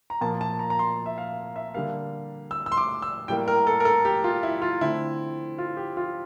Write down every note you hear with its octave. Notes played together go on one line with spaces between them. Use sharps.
A#5
A#2 F3 A#3 A5
A5
A#5
A#5
C6
E5
F5
E5
D3 G3 A#3 F5
E6
E6
C6
D6
E6
A2 G3 A#3 G5
A#4
A4
A#4
A4
G4
F4
E4
F4
D3 A3 C4 E4
F4
G4
F4